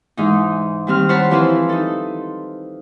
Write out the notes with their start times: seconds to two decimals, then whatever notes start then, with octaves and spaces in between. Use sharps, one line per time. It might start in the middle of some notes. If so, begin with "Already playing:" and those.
0.17 G#2 E3 D#4
0.87 D#3 G3 C4 F6
1.09 C5 C#5 F#5 A5 B5 C6
1.31 E3 F3 C4 E4 B4 C5
1.69 D#4 A4